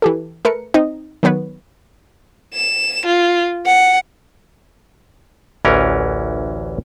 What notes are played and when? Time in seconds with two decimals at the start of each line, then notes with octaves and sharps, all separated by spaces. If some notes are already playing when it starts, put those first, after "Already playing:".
0.02 E3 G4 A4
0.45 A3 A#4 B4 C#7
0.74 C4 D#4 D#5
1.23 D#3 F#3 B3 B4 C#5
2.54 E7
3.06 F4
3.66 F#5
5.65 A1 D2 E3 C#4 A#4